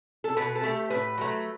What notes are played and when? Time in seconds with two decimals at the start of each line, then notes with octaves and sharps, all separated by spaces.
0.24 A4
0.37 B2 B4
0.55 A4
0.63 A3 G4
0.90 A2 B4
1.18 F#3 A3